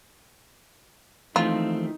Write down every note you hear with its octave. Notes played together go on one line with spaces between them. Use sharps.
D#2 E3 F3 A3 C4 D#4 F4